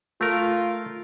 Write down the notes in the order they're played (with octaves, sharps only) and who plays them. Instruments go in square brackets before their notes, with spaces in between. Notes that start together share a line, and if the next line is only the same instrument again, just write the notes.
[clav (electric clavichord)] A3 A#4 [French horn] F4